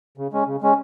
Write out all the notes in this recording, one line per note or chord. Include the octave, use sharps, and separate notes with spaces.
C#3
G#3 C#4
C#3
G#3 C#4